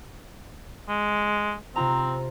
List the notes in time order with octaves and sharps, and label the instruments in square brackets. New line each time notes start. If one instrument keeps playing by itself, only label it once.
[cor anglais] G#3
[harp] C3 F4 A#5 [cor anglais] C4